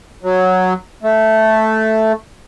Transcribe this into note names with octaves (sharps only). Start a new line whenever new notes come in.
F#3
A3